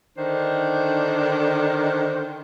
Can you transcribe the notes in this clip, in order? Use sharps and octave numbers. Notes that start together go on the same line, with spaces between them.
D3 D#3 D4 C5